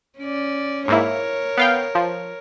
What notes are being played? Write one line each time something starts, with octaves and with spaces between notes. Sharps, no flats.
C#4 D5
G#2 A#3 E4 A#4 C#5
B3 F5 G5
F3